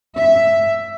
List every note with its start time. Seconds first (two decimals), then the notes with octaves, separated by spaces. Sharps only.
0.16 E5